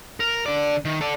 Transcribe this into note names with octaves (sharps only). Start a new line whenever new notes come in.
A#4
D3 D5
D#3
A4 D5